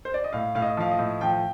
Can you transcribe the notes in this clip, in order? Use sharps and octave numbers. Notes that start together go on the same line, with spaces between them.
C5
D5
D#5
A2 F5
A2 F5
D#5
F3 F5
D#5
A2
F3 G5